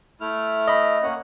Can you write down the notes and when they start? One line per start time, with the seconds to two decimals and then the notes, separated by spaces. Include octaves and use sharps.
0.21 A3 E4 F6
0.68 D#5 B5
1.03 A#3 C#4 F#5